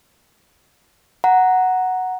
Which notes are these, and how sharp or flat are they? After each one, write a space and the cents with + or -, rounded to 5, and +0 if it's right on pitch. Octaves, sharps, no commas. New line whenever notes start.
F#5 +0 A#5 +0